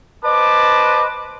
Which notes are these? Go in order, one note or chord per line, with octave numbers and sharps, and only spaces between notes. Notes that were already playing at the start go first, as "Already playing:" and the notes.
B4 C5 D#5 A5 D6